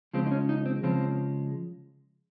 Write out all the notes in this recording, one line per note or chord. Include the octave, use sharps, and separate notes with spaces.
C#3 F3 G#3 C4
D#4
C#4
D#4
C4
C#3 F3 G#3 C4